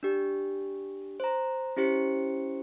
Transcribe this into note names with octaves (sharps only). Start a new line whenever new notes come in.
D4 G4
C5 A#5
C#4 E4 G4 C5 C#7